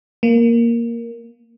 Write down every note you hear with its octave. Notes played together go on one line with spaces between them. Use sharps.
A#3